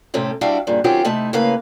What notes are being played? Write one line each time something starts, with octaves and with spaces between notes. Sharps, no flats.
A2 C3 C4 C#4 A4
G3 D4 E4 F#4 F5 G5
G2 A#2 C#3
D#3 F#3 C4 C#4 F4 G4
C3 A3 D#4 E4 A5
A2 C#3 A#3 B4 F5